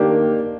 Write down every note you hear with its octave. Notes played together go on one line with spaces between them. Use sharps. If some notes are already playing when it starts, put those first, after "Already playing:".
Already playing: D#3 A#3 D4 G4 D5